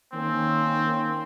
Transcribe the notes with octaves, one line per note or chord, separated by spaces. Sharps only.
D#3 A#3 C4 C#4